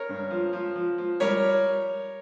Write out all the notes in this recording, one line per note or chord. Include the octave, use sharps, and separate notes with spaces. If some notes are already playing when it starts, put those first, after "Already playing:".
Already playing: A#4 C#5
G2
F3
F3
F3
F3
G3 A#4 C#5